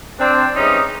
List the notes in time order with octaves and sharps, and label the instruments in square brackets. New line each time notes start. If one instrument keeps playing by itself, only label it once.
[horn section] C4 D4
G#2 E3 G3 C#4 D#4